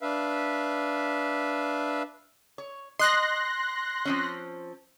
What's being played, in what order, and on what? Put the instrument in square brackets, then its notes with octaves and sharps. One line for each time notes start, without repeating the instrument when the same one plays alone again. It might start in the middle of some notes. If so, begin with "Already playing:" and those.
[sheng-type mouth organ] D4 B4 E5 F5
[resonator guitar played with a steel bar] C#5
[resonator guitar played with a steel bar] D#5 [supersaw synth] C6 F#6 A#6
[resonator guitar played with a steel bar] F3 C4 C#4